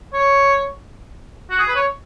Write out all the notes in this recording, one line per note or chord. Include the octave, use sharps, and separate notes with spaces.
C#5
F#4
G#4
B4
C#5